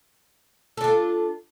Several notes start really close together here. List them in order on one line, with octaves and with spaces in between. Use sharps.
A4 D4 F4